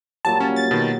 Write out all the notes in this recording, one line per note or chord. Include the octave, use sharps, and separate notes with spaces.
A#2 F#3 G3 A5
C#4
A6
B2 D#3